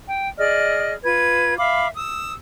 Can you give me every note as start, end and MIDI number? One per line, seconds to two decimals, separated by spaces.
0.09 0.28 79
0.38 0.94 68
0.38 0.94 74
0.38 0.94 75
0.38 0.94 89
1.04 1.57 65
1.04 1.57 71
1.04 1.57 92
1.58 1.87 76
1.58 1.87 77
1.58 1.87 83
1.58 1.87 86
1.95 2.33 87
1.95 2.33 88